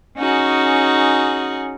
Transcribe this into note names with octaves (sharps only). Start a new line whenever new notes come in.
C#4 D#4 F#4 G#4